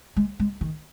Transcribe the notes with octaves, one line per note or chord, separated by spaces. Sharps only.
G#3
G#3
D#3